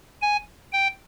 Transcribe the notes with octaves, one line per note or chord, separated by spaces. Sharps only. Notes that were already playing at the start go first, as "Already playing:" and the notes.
G#5
G5